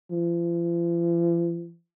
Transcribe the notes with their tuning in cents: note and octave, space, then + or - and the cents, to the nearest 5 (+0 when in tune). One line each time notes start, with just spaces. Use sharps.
F3 -45